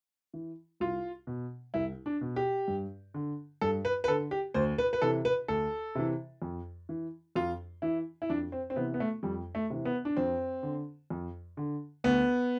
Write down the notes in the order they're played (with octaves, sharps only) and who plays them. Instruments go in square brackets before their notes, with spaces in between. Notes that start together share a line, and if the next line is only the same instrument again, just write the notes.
[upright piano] E3
C2 F4
B2
C2 E4
D4
B2
G4
G2
D3
G2 A4
B4
B4
D3 A4
G4
D2 C5
B4
B4
C3 E3 A4
B4
D2 A4
C3 E3
F2
E3
F2 F4
E3 E4
E4
F2 D4
C4
C4
C3 E3 B3
B3
A3
F2 G3
A3
C3 E3
B3
D4
F2 C4
D3
F2
D3
D2 B3